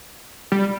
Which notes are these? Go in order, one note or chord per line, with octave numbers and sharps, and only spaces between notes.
G3